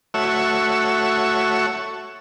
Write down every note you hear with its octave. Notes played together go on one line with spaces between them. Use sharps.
A3 F#4 C#5 E5